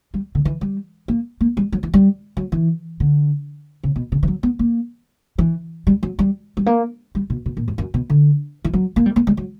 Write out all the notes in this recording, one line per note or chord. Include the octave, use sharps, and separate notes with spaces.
G3
D3
E3
G3
A#3
A#3
G3
F#3
E3
G3
F#3
E3
D3
C#3
B2
C#3
E3
F#3
B3
A#3
E3
G3
F#3
G3
G3
A#3
G3
B2
B2
A#2
G2
F#2
B2
D3
E3
F#3
A#3
G3
A#3
G3
F#3